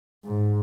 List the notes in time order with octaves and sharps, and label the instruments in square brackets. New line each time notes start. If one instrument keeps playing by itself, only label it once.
[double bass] G#2